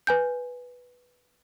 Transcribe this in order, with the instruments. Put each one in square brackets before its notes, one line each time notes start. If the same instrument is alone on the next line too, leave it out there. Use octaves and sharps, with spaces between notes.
[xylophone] B4 G#5 G6